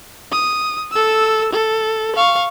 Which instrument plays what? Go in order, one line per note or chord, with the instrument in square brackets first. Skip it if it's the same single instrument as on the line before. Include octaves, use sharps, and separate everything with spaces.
[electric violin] D#6
A4 E6
A4
F5 C#6